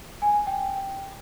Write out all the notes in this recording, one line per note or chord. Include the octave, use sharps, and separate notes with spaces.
G#5
G5